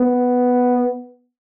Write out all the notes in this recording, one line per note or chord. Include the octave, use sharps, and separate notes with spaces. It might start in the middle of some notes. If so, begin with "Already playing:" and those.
Already playing: B3